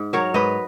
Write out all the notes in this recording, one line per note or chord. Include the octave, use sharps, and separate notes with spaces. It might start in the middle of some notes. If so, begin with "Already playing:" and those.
Already playing: G#2
F#3 A#4 C#5
G#2 B4 D#5